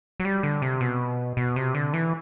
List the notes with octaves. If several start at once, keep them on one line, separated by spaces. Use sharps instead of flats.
F#3
G3
D3
C3
B2
B2
C3
D3
E3